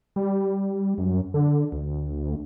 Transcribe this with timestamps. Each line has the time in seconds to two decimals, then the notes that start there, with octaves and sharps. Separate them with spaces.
0.16 G3
0.98 F#2
1.34 D3
1.72 D2